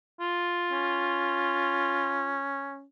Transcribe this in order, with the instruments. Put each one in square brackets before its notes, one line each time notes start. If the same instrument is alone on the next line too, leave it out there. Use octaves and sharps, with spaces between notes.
[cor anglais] F4
[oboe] C#4